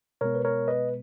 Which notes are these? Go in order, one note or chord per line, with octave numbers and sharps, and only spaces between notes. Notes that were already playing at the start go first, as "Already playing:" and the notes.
B2 G#3 B3 A#4 C#5
B4
A#4 C#5
B4 D#5